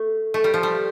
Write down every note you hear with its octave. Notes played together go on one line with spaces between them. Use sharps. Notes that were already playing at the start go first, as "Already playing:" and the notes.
Already playing: A3
A3
G3
F3
G3